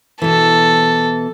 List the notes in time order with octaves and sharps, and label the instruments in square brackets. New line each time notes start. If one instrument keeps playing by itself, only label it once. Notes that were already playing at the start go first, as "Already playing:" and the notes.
[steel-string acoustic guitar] B2 E3 [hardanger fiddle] A4